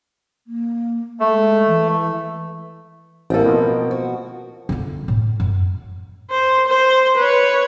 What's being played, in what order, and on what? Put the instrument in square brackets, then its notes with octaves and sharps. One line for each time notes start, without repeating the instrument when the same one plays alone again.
[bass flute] A#3
[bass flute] G#3 [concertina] A3
[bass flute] E3
[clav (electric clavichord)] A1 A4 [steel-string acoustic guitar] A#3 C4
[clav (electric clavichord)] B2 F3
[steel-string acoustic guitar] F#4
[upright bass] D3 F4
A2
F#2
[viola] C5
C5
B4 C#5